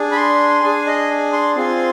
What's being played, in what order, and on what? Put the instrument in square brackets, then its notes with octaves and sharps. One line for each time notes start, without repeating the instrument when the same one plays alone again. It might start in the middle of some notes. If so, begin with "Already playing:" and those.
Already playing: [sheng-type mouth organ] D4 G#4
B5
C6
D4 G#4 G#5
D#5
C6
C4 F4 G#4 C6